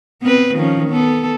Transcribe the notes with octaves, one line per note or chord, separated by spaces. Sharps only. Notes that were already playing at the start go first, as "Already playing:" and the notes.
B3 C4 B4
D#3 F3 C#4
B3 A4